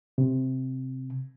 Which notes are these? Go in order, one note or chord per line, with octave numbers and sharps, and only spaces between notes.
C3